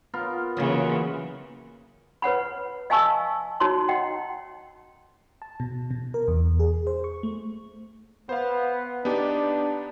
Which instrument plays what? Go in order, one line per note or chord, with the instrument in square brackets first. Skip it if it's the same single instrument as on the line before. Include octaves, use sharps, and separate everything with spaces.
[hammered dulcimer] B3 F4 A#4
[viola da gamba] C#3 E3 [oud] F#3 A#3
[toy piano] B4 C#5 F#5 B5
D#5 F5 G#5 A5 C#6 E6
D#4 F#4 C#5 A#5 C6
D#5 F#5 G5
[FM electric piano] A5
B2
B2
A#4
E2
G#4
C5
C#6
A3
[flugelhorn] B3 [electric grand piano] C5 F5
[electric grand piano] B3 D#4 G4 [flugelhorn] D4